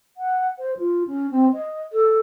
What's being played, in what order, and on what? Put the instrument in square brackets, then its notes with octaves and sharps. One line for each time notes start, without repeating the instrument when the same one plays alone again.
[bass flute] F#5
C5
F4
C#4
C4
D#5
A4